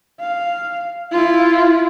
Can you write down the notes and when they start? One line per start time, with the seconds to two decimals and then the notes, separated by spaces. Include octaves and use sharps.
0.20 F5
1.11 E4 F4